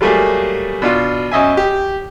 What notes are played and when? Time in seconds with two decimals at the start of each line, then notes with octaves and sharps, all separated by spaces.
0.01 F#3 G3 A3 A#3 G#4
0.82 B2 D4 F4
1.31 F#2 D#5 E5 G#5
1.57 G4